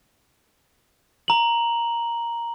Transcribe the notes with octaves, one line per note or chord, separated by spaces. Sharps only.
A#5 F#7